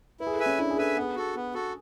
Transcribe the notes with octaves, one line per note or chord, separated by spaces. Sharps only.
E4 B4
G#4
A4
B4 E5 G#5
C#4
D4 E4
G#4
A4 B4 E5 G#5
B3 G#4
F#4 A4
B3
F#4 A4